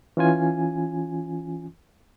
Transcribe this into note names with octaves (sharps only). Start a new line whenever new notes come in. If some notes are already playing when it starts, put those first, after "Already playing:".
E3 C#4 F4 G#5